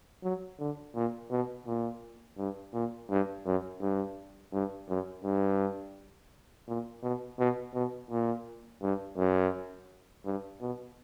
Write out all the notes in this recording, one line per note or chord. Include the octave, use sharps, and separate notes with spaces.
F#3
D3
A#2
B2
A#2
G2
A#2
G2
F#2
G2
G2
F#2
G2
A#2
B2
B2
B2
A#2
G2
F#2
G2
B2